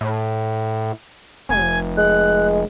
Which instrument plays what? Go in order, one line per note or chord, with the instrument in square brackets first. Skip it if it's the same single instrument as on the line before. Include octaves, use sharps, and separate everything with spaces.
[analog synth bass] A2
[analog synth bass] F1 [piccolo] G#5
[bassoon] G#3 [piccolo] F#6